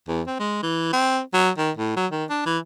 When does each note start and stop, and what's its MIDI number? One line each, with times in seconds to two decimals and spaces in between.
0.08 0.22 40
0.27 0.36 60
0.39 0.61 56
0.63 0.92 52
0.93 1.20 60
1.34 1.50 54
1.58 1.71 51
1.77 1.92 45
1.96 2.07 54
2.12 2.25 51
2.30 2.42 62
2.46 2.58 52